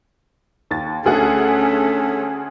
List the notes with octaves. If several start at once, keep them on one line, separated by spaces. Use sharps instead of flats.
D#2 A6
D2 A3 C#4 G#4 F#5